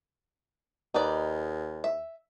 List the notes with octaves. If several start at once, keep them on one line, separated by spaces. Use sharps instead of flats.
D#2 D#4 B4 D5
E5